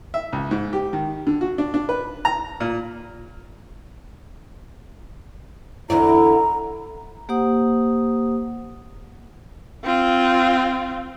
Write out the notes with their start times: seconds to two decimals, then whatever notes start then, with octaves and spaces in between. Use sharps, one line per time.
0.14 E5
0.33 C#2
0.51 G#2
0.73 G4
0.93 D#3
1.27 D3
1.41 F#4
1.58 D4
1.74 D4
1.89 B4
2.25 A#5
2.60 A#2
5.90 E2 D3 E4 D5 A#5
7.29 A#3 G4 C5 F#5 D#6
9.84 C4 F4